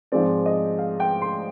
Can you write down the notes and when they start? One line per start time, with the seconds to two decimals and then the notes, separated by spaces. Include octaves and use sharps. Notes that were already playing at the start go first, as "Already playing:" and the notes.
0.12 G#2 F3 G#3 C4 D5
0.46 D#5
0.78 F5
1.00 G5
1.22 C6